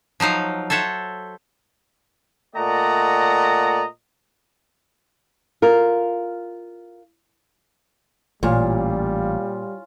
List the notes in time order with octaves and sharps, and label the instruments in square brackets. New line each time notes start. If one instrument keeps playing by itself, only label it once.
[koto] F3 F#3 D#4 F5
A4 C5 C#5 E5 F#5
[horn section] A#2 A3 D5 D#5 F#5 A#5
[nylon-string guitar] F4 A#4
[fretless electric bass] A1 [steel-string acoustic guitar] A#2 [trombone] G3 [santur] C#4 F4